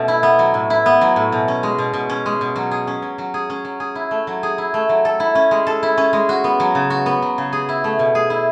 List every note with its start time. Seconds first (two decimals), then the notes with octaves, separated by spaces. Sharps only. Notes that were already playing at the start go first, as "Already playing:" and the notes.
Already playing: B2 A3 C#4
0.08 E4
0.23 B3
0.39 F#3
0.54 A2
0.70 E4
0.86 B3
1.01 F#3
1.16 A2
1.32 B2
1.48 C#4
1.63 G#3
1.78 B2
1.94 B2
2.10 C#4
2.26 G#3
2.41 B2
2.56 F#3
2.71 G#4
2.87 C#4
3.02 F#3
3.18 F#3
3.34 G#4
3.50 C#4
3.65 F#3
3.80 G#4
3.95 E4
4.11 A3
4.27 F#3
4.43 G#4
4.58 E4
4.74 A3
4.89 F#3
5.05 A4
5.20 E4
5.35 C#4
5.51 G#3
5.67 A4
5.83 E4
5.98 C#4
6.13 G#3
6.29 F#4
6.44 B3
6.60 F#3
6.75 C#3
6.90 F#4
7.06 B3
7.22 F#3
7.38 C#3
7.53 G#4
7.69 E4
7.84 A3
7.99 B2
8.15 G#4
8.30 E4